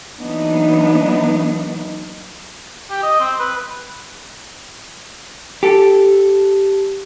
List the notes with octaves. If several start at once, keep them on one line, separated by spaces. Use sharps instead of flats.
E3 F#3 A#3 B3 D4 D#4
G4
D#5
C4
B4
G4 A4